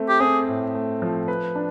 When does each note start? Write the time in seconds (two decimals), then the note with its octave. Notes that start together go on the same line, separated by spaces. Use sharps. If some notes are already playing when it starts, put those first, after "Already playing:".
Already playing: A3 C4
0.09 G4
0.20 C4 G#4
0.48 A2
0.75 A3
1.02 F3
1.28 B4
1.55 D4